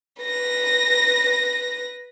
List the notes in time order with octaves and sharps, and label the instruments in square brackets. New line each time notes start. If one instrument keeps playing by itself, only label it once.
[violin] B4 A#6